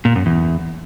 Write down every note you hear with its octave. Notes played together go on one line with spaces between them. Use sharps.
A#2
F#2
E2